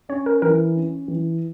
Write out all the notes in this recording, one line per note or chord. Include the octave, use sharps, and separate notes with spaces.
C#4 C#5
A#4
E3 A#4
C#4
E3